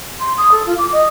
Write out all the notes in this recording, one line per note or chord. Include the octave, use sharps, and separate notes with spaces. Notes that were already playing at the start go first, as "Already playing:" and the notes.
C6
D#6
A4
F4
D6
D#5